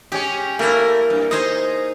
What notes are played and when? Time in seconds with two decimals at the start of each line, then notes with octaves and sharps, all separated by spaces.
0.12 G#3 C#4 G4
0.59 A3 A#3 E4 A#4
1.10 G2
1.31 D#4 G#4 C5 D#5